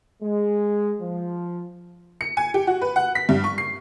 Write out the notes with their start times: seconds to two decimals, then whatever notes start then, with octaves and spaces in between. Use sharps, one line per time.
0.23 G#3
1.02 F3
2.21 C#7
2.37 G#5
2.54 G4
2.67 F#4
2.81 B4
2.96 F#5
3.15 B6
3.29 G2
3.44 C#6
3.58 C7